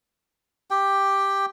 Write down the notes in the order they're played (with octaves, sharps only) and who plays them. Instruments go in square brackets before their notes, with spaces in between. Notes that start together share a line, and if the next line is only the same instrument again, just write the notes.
[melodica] G4 G5